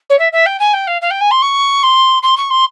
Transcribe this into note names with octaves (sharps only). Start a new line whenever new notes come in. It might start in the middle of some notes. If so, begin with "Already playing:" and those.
C#5
E5
E5
G5
G#5
G5
F5
F5
G5
G#5
C6
C#6
C6
C6
C#6
C6